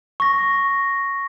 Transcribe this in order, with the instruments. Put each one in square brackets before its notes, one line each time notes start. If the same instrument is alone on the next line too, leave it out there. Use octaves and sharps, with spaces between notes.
[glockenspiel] C#6 A#6